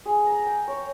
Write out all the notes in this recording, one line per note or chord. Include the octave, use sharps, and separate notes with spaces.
G#4
A#5
G5
C#5